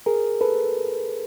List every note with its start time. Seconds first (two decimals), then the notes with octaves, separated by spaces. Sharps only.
0.06 G#4 A#4
0.41 A4 B4